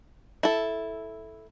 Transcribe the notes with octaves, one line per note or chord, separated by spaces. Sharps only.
E4 A4